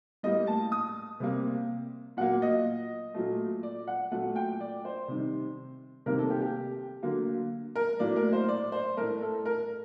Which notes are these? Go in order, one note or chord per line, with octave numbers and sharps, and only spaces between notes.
A2 G3 A#3 D#5
A5
D#6
C3 G3 A#3
A#2 F#3 A#3 F#5
D#5
A#2 F#3 A3
D5
F#5
A#2 F#3 A3 F#5
G5
D5
C5
C3 D#3 G3
C3 D#3 G3 A#3 A#4
A4
G4
G4
D3 F#3 A#3
A#4
A2 F#3 A#3 D5
A#4
C5
D5
C5
A2 A3 A#4
A4
A#4